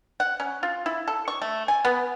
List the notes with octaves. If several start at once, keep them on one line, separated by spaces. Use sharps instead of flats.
F#5
C#4
F4
E4
A4
C#6
A3
G#5
B3